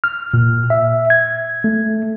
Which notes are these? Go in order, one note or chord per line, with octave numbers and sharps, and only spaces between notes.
F6
A#2
E5
G#6
A3